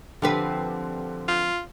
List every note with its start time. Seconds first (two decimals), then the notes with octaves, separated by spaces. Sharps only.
0.22 D3 F3 C4 G4 B4
1.28 F4